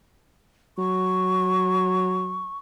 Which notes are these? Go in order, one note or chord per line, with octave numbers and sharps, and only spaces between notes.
F#3 C#6